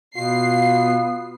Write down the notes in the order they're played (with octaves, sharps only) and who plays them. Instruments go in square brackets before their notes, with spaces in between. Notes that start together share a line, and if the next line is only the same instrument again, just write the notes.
[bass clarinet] B2 [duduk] B3 [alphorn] F4 [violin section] C7